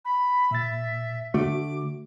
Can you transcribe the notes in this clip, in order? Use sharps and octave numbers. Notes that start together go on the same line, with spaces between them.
B5
A#2 E5 A6
D3 A3 F#4 D6